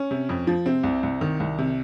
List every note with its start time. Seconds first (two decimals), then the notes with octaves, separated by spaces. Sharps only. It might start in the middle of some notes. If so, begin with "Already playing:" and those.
Already playing: C#4
0.11 C3
0.29 F2
0.47 F3
0.66 C3 C4
0.83 C2
1.03 C2
1.21 D#3
1.40 C2
1.58 C3